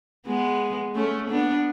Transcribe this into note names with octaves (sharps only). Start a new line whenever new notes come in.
G#3 B3
A3 C#4
B3 D4